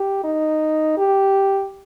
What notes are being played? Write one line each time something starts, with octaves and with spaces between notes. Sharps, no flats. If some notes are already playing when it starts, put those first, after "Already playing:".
Already playing: G4
D#4
G4